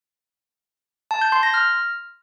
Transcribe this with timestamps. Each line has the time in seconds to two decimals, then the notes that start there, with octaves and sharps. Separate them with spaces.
1.11 A5
1.21 G6
1.32 C6
1.43 A#6
1.54 F6